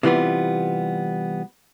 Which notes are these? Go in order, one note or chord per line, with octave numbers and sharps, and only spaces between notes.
C3 E3 G3 B3 F4